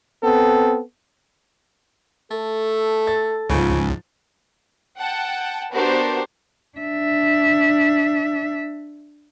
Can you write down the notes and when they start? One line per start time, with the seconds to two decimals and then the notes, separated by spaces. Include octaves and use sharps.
0.23 B3 C4 A4
2.31 A3 A4
3.07 A6
3.50 C#2 G#2 C#3 F3
4.97 F#5 G5 A5
5.72 B3 D4 F#4 G4 A#4 C5
6.78 D4 E5